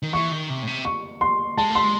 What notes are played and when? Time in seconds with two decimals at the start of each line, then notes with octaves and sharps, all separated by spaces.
0.03 D#3
0.13 E3 C#6
0.31 D#3
0.49 C3
0.63 A2
0.67 C3
0.85 C#6
1.21 C6
1.57 G#3 A5
1.70 A3 C6
1.84 G#3